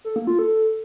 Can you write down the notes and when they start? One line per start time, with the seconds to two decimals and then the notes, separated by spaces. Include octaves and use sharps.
0.05 A4
0.16 A#3
0.27 F4
0.39 A4